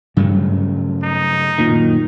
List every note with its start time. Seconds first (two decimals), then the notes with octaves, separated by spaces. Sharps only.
0.17 G2 C#3 F#3 A3
1.03 D#4
1.58 F#2 A#2 D#3